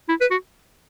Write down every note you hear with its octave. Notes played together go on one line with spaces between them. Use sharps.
E4
B4
F#4